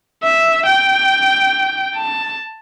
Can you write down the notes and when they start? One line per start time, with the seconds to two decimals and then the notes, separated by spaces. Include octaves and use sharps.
0.23 E5
0.66 G5
1.95 A5